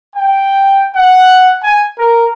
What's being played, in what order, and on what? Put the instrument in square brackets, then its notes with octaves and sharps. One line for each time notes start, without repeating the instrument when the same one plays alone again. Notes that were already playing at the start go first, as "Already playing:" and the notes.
[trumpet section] G5
F#5
G#5
A#4